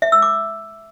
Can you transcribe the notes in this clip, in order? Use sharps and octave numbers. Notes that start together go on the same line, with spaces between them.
E5
E6
D6